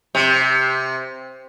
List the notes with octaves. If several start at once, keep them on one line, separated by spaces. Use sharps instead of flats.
C3